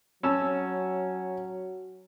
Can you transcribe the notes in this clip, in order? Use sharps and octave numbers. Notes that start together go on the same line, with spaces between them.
F#3 C#4 A5 E6